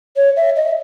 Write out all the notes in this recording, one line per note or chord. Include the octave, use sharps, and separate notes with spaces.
C#5
E5
D#5